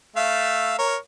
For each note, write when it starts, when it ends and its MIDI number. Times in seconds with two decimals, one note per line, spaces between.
0.16 0.74 57
0.16 0.74 76
0.16 0.74 77
0.78 0.96 70
0.78 0.96 73